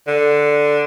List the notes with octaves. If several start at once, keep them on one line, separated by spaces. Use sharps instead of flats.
D3